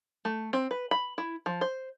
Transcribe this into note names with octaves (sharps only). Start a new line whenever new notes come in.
A3
C4
B4
B5
E4
F3
C5